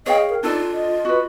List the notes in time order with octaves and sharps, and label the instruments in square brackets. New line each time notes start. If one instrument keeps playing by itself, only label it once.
[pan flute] G#4 [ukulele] C#5 F5 G5 [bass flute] D#5
[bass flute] A#4
[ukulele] D4 A4 D5 [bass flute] D#4 [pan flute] F4
[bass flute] D#5
[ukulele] F#4 B4